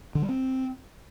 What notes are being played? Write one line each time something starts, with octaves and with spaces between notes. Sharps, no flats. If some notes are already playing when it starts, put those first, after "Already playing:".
D3
G3
C4